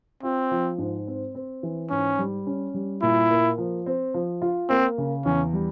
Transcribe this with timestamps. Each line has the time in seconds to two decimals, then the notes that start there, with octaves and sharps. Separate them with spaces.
0.23 C4 F4
0.51 F3
0.78 G#2
1.07 C4
1.35 C4
1.63 E3
1.90 G#2 C#4
2.19 G3
2.47 C#4
2.74 G3
3.02 A#2 E4
3.31 A#3
3.58 F3
3.86 C4
4.14 F3
4.42 F4
4.69 A#3 C4
4.98 C#3
5.25 E2 C#4
5.53 G3